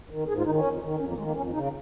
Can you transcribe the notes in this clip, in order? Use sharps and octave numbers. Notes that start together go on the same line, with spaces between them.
D#3
G#2 G#4
F4
D#3 D#4
C#4
F2
D#3
F2 C#4
A#3
D#3 G#3
A#3
F2 C#4
C#3 D#4